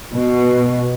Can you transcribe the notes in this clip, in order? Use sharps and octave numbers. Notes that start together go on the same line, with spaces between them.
B2